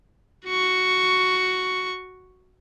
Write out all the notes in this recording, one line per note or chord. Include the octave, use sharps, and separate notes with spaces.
F#4 C#6